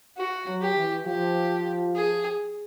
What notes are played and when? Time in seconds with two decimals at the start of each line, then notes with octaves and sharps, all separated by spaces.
0.17 F#4
0.47 F#3
0.62 G4
0.76 E3
1.06 F3 G4
1.95 G#4